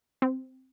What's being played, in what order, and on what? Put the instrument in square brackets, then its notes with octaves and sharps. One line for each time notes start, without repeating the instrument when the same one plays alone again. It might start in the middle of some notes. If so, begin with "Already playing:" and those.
[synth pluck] C4